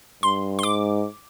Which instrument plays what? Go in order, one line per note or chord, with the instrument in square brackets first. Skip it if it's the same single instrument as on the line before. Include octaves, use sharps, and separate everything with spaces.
[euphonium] G2 [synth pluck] C6
[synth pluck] C6
[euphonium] G#2 [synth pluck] D6